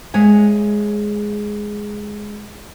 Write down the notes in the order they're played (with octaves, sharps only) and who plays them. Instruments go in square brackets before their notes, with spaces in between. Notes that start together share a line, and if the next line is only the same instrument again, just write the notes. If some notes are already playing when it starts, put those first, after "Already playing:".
[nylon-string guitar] G#3 C#5 E5 G#5